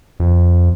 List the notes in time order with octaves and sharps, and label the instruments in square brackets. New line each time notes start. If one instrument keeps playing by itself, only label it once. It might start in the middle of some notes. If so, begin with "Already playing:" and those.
[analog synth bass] F2